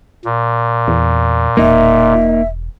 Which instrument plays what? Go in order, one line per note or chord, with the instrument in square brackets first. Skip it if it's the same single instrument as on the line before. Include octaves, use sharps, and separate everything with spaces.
[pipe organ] A#2
[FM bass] E2
[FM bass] E1 [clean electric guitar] A#3 D#4 [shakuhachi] E5